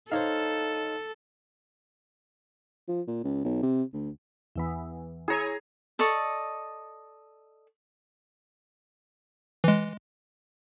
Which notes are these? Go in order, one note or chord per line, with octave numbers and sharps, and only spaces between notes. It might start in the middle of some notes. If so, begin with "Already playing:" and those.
D#4 A4 C5 C#5 F5
F3
A#2
C#2
B1
C3
D2
E2 E3 B3
E4 G#4 C#5 G#5 A#5
A4 D5 D#5 C#6
E3 G#3